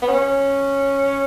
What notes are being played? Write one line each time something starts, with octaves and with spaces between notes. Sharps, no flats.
B3
C#4